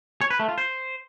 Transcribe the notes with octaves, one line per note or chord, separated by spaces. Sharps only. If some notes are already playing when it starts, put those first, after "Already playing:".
C#5
B4
A3
F4
C5